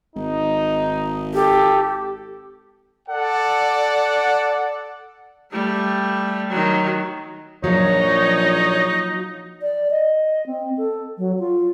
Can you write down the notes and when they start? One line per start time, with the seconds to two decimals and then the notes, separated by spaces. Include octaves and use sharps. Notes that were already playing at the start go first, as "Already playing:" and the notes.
0.16 G#1 D#4
1.34 G4 A4
3.09 A4 D5 F#5
5.52 G3 A3
6.50 D#3 F#3
7.64 A#1 F3 F#3 D#4 C#5
9.61 D5
9.91 D#5
10.47 C4
10.78 A4
11.18 F#3
11.39 F4